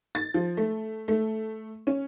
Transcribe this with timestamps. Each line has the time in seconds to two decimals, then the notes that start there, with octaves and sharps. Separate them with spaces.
0.15 A6
0.34 F3
0.57 A3
1.08 A3
1.87 C#4